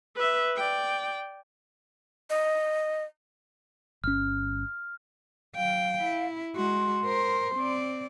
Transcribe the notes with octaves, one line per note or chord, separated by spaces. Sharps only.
B4 E5
D5 G5
D#5
G1 C#4 F6
F#3 F5 G5
E4
G#3 F#4 C6
A#4 C5
C4 D5